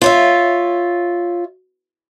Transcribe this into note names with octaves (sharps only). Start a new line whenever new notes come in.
F4 C#5 E5